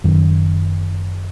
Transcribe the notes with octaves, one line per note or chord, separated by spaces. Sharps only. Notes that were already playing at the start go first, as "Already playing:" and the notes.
F#1 F#2 D#3 F#3